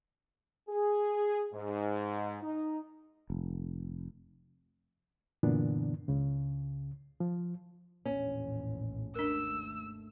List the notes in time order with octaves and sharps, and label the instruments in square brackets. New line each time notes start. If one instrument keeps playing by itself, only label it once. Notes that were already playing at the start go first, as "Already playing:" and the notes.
[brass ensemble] G#4
G#2
D#4
[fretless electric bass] F1
[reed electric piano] F#2 A#2 D3 E3 B3 D4
C#2 C#3
F3
[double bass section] A#1 E2 A2 [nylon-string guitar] C#4
[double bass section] G#1 D#2 A3 [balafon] D4 A#4 [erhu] E6